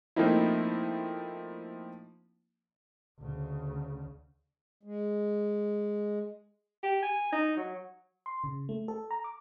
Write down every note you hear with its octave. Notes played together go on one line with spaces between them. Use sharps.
F3 A3 A#3 C4 D#4 E4
D2 C#3
G#3
G4
G#5
D#4
F#3
C6
C#3
A3
A4
A#5
D6